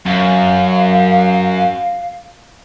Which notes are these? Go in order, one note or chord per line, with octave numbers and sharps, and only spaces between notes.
F#2 F5